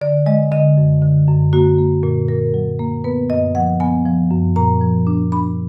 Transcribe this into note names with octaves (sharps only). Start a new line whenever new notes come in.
D3 D5
G#3 D#5
D3 D#5
F#2
D3
F#2
A#3 F#4
A#3
A#2
A#2 A#4
F#3
A#3
B3 B4
F#2 D#5
F3 F#5
B3 G#5
F3
F#2
A#2 A#5
F3
D4
D4 B5